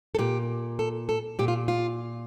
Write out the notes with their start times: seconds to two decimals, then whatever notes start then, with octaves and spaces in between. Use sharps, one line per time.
0.15 A4
0.19 A#2 G4
0.79 A4
1.09 A4
1.39 A#2 G4
1.48 F4
1.68 F4